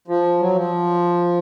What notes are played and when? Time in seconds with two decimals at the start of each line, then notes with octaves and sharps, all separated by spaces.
0.08 F3
0.40 F#3
0.55 F3